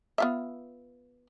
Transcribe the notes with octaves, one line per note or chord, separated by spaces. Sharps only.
B3 F4 E5